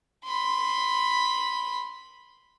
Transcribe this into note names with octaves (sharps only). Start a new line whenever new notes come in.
B5 C6